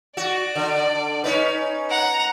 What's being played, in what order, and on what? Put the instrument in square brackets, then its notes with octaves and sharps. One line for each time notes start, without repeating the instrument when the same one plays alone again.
[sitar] F#4 [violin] D5
[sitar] D3
C#4 D#4 B4
[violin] F#5 A#5